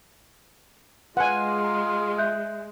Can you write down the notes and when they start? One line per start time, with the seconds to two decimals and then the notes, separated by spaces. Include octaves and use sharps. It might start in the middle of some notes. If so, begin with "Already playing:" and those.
1.17 G#3 F4 B4 D#5 F#5 G#5
1.64 A#5
2.18 E5 F#6 G6